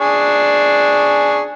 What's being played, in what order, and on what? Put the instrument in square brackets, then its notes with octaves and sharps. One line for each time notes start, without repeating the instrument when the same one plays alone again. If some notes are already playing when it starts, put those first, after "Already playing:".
[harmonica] D4 G#4 C#6